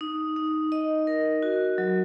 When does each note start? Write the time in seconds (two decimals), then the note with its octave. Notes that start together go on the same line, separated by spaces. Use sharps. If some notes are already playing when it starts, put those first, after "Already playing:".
0.01 D#4
0.36 D#4
0.72 D#5
1.07 A#4
1.42 F#4
1.78 F#3